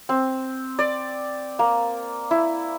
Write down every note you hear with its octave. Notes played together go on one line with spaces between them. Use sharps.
C4
D5
A#3
E4